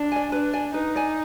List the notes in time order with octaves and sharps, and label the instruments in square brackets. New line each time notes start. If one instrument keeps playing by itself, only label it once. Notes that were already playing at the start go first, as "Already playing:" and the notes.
Already playing: [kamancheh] D4
[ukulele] D5 G#5
[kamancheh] D4 [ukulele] B4
[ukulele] D5 G#5
[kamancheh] D#4 [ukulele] B4
[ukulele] D5 G#5